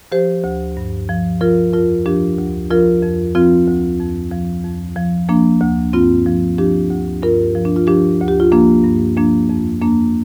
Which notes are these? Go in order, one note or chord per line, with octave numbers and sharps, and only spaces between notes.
F3 G4 C5
D2
G2
F3
F3 F4 A#4
F2 F4 A#4
F3 D4 G4
D2
F3 F4 A#4
F2
F3 C4 F4
D2
F2
F3
F2
F3
F3 A#3 D4
D2
G2 C4 F4
F3
F3 D4 G4
D2
G2 F4 A#4
F3
D4
F4
F3 D4 G4
D2
G4
F4
F3 A#3 D4
G2
F3 A#3 D4
F2
F2 A#3 D4